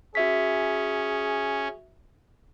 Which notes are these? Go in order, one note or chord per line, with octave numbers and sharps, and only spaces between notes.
C#4 F#4 G#4 E5 B6